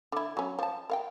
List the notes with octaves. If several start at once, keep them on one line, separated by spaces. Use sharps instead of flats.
D3 E4
F#3 C#4
F3 A5
A#4 F5 G5